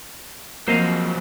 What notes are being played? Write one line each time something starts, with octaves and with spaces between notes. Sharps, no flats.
F3 F#3 A#3 C4 C5 D#5 F5